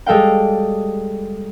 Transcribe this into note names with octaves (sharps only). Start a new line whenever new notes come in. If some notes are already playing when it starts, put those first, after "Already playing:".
G3 G#3 A4 F5 G5